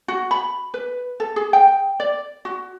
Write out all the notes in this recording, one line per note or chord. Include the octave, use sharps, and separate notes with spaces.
F#4
B5
B4
A4
G#4
G5
D5
F#4